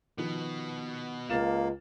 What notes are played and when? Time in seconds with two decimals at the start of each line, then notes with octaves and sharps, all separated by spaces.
0.18 B2 D#3 F3 B3
1.30 C#2 A#3 F6 A6 E7